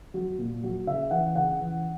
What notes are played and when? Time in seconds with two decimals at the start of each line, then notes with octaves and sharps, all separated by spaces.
0.14 F#3
0.38 A#2
0.63 F#3
0.86 C#3 E5
1.11 E3 F#5
1.35 C#3 F#5
1.59 E3